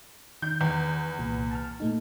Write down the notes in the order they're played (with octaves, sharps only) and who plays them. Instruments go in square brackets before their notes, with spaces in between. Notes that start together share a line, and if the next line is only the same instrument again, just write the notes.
[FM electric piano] D#3 [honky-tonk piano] G6
[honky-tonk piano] E2
[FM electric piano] C2 A#2
A5 F6
A#2 A3 D#4